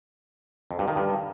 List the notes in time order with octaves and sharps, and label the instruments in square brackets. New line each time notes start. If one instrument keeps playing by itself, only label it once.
[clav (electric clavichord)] F2
G2
D#3
G2